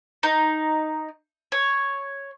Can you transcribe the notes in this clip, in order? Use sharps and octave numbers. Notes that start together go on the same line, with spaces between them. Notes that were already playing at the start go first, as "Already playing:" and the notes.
D#4
C#5